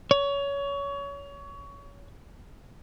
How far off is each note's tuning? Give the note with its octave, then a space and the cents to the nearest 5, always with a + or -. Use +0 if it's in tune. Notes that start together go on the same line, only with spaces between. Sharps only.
C#5 +25